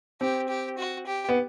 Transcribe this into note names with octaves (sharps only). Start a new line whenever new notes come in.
C4 G4
G4
F#4
G4
B3